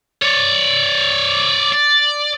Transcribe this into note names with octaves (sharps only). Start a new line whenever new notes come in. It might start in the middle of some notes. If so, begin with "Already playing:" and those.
C#5 D5
D5